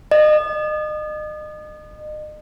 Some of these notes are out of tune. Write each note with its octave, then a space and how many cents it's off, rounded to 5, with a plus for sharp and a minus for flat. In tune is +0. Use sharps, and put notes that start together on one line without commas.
D#5 -35